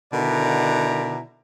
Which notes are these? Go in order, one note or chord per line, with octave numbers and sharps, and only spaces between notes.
B2 D3 D#3 E4 D5 A#5